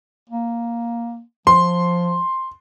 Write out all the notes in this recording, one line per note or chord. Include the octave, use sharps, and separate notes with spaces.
A#3
F3 C6